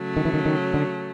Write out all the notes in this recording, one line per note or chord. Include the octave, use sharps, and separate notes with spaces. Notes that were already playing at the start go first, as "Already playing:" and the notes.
Already playing: C#3 F#3 A3
D#3
E3
D#3
D#3
D3